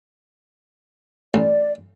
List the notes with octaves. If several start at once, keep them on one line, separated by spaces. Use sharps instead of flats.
A1 D5